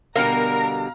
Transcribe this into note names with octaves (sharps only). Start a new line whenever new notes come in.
B2 D3 G3 A#4 F5 A#5